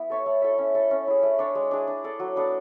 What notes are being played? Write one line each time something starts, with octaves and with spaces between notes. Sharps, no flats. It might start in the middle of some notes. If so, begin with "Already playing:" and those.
Already playing: B3 E4
A4 C#5 E5
A3
E4 A4 E5
C#4
E4 A4 E5
C#4
E4 G#4
A3
D4 A4 C#5
G#3
D4 G#4
D4
A4 D5
F#3
B3 D4 A4